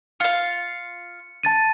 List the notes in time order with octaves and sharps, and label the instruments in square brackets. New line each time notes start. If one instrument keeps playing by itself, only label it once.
[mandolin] F4 F5 [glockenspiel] C#7
[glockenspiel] A5 A6 D#7